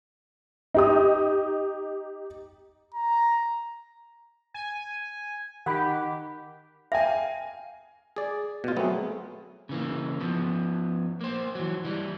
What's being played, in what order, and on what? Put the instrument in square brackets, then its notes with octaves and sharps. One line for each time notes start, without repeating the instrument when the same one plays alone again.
[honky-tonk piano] D#4 G4 D#6
[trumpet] A#5
[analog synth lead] G#5
[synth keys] D#3 D#4 [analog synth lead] G4 [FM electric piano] F#5 B5
[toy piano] E5 [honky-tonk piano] F5 G5 G#5
[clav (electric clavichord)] G#4 D5
B2 F4
[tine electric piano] F#3 A3 G#4 [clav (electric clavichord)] B3 C4
[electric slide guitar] C#3 E3 A#3
F3 B3
A#3 C5
E3 F#3
E3 G3